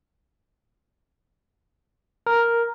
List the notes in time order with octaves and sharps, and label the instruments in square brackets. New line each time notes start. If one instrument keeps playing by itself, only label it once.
[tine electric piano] A#4